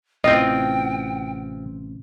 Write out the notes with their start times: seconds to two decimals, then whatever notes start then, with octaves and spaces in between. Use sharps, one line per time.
0.24 A1 C3 E3 C4 F4 D#5 G5